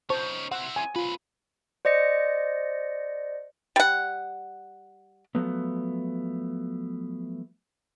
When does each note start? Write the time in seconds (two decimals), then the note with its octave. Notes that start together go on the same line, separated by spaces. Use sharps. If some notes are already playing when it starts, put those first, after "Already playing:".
0.10 C#4 D#4 C5 A5 C#6
0.51 C4 E4 F#5
0.76 G#5
0.96 C4 F4 B4
1.85 C5 D5 D#5 A#6 C#7
3.76 G3 F#5
5.35 F3 F#3 A3 B3